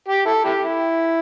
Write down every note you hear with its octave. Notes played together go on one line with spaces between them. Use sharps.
G4
E4 A4
E4 G4
E4